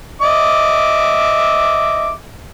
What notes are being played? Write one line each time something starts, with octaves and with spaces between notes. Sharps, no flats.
D#5 E5 D6